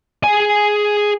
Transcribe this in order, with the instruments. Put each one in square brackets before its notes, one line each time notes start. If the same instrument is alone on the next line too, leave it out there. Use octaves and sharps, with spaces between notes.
[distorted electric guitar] G#4 G#5